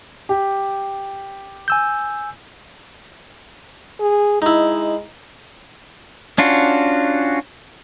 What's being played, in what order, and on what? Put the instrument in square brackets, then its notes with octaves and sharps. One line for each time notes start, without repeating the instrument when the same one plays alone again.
[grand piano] G4
[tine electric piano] G#5 E6 G6
[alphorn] G#4
[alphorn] G#3 [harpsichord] D#4 E4
[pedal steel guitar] C#4 D4 F4 F#4